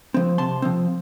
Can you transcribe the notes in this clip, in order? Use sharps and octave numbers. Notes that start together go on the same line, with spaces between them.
F3 C4
C3 A5 C6
F3 C4